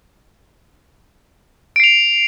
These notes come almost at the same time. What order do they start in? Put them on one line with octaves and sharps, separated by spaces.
D7 C7 F7